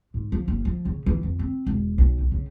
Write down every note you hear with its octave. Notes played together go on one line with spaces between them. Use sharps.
G#2
F3
F#1
F3
C#3
E3
F2
C4
E1
B1
D#3
C#3